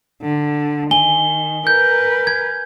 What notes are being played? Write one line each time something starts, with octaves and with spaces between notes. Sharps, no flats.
D3
D#3 G#5 G7
A#4 B4 G6
G#6